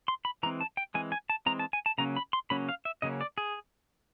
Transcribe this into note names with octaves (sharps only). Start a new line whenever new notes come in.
C6
B5
E3 G#3 C4 A#5
A5
G5
E3 G#3 C4 G#5
G#5
A5
E3 G#3 C4 A#5
A5
G#5
A5
C#3 F#3 A#3 C#4 A#5
B5
C6
C#3 F#3 A#3 C#4 B5
F5
E5
C#3 F#3 A#3 C#4 D#5
D5
G#4